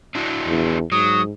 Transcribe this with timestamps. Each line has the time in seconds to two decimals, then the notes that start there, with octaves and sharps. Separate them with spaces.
0.15 D4 E4 F#4
0.47 E2
0.92 G#2 F#3 D#6